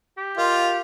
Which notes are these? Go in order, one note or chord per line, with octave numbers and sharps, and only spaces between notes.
G4
F4 A#4 D#5 C6